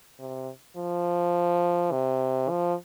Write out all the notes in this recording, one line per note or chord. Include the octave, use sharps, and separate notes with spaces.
C3
F3
C3
F3